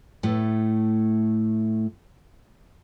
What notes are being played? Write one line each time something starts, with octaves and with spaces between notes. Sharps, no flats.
A2 A3